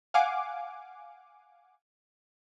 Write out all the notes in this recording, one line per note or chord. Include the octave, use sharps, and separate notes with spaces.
F5 F#5 G#5 D6